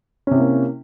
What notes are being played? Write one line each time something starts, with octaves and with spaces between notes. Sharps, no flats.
C3 A#3 C#4 E4